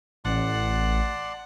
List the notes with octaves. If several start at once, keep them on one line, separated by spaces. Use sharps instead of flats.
A1 D5 F#5 A5 C6